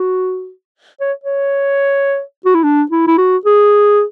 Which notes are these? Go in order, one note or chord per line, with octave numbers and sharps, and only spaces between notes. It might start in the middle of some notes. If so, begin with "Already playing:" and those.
Already playing: F#4
C#5
C#5
F#4
E4
D4
E4
E4
F#4
G#4